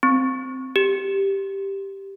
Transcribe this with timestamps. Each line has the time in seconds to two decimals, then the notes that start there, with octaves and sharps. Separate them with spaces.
0.03 C4
0.76 G4